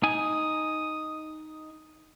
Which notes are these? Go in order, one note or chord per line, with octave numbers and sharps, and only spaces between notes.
D#4 G#5 D#6